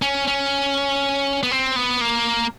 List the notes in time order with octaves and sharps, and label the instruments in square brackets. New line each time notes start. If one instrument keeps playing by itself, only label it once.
[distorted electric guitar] C#4
C#4
B3
C4
B3
A#3